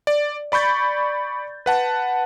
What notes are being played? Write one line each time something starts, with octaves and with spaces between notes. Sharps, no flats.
D5
D5 B5 C#6 G6 A6
B4 F#5 A5